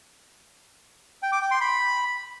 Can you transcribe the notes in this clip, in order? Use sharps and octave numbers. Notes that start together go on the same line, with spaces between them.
G5
D6
G5
C6
B5